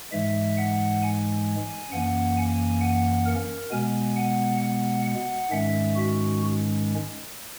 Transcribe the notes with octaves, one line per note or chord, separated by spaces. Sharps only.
G#2 E3 G#3 E5
F#5
G#5
F#2 E3 A#3 C#4 F#5
G#5
F#5
A#4
B2 G#3 B3 G#5
F#5
F#5
F#5
G#2 D#3 G#3 C#4 E5
F#4